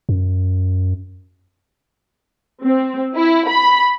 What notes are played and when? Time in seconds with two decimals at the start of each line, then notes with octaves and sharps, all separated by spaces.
0.09 F#2
2.63 C4
3.15 E4
3.49 B5